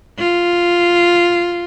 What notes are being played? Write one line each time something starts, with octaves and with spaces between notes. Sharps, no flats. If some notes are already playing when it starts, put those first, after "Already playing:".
F4